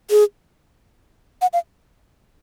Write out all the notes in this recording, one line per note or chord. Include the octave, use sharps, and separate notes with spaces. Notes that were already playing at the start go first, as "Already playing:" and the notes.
G#4
F#5
F5